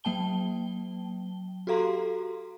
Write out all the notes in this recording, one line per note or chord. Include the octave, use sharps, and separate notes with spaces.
F#3 A#3 G5 A5 G7
F#4 G4 A4 F5 A#5 C6